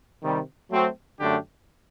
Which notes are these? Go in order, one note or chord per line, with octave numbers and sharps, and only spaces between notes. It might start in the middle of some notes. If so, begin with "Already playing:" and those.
C3 D#3 G3
F#3 A3 C4 F#4
F#2 D3 A3 D4 G4